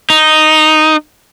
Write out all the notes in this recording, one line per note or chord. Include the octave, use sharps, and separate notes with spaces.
D#4